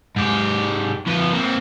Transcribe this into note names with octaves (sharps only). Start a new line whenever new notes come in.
G#2 G4
F3 B4
A#3 C4